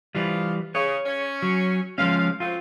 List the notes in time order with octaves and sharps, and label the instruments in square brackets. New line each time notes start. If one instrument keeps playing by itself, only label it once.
[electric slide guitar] E3 G3 [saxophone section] F3 F4
[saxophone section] C#3 [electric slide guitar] C#5
[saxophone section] C#4
[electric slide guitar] F#3
[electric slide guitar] F3 G#3 C#4 [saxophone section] F5
[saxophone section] F#3 A3 C4 [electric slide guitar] F4